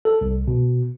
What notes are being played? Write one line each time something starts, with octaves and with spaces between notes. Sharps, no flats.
A4
C2
B2